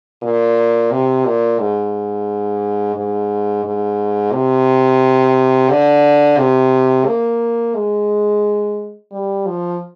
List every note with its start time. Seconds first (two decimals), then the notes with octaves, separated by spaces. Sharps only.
0.22 A#2
0.91 C3
1.25 A#2
1.60 G#2
2.95 G#2
3.64 G#2
4.33 C3
5.70 D3
6.38 C3
7.06 A#3
7.75 G#3
9.12 G3
9.46 F3